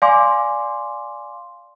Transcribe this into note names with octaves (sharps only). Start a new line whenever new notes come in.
D5 F5 G#5 C6 D6